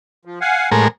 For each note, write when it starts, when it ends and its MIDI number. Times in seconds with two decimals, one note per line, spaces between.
0.25 0.39 53
0.41 0.70 77
0.41 0.70 78
0.41 0.70 80
0.71 0.88 45
0.71 0.89 53
0.71 0.88 56
0.71 0.88 70